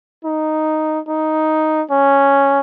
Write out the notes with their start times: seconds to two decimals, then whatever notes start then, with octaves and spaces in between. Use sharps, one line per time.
0.25 D#4
1.08 D#4
1.90 C#4